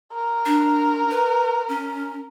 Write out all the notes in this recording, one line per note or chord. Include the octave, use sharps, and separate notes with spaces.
A#4
D4
B4
C#4